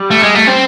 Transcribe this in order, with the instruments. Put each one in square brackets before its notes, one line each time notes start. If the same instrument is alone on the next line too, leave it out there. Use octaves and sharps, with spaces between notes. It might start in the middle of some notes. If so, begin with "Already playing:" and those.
Already playing: [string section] G3
[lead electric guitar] A3
G#3
A3
C4